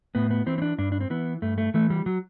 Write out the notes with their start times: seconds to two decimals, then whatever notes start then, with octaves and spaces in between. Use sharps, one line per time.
0.15 A2 B3
0.31 B3
0.46 E3 C4
0.58 C4
0.62 D4
0.78 G2 D4
0.92 D4
1.01 C4
1.10 E3 B3
1.42 G2 A3
1.58 A3
1.74 E3 A3
1.90 G3
2.06 F#3